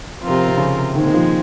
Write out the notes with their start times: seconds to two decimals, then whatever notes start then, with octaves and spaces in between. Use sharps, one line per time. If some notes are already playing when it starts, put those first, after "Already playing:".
0.20 F3 C4 F4 A#4
0.29 C3
0.48 C3
0.57 C#3
0.95 A#2 D#3 G#3 C4
1.06 D#3
1.14 F3